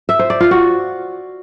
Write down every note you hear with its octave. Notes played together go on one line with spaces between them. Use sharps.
E5
C5
D5
F4
F#4